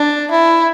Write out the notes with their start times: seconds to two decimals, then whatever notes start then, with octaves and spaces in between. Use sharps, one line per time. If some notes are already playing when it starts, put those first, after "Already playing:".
Already playing: D4
0.31 E4